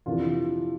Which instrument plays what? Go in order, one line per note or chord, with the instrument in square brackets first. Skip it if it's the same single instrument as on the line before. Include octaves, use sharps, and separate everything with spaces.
[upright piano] F2 C3 E3 D4 F4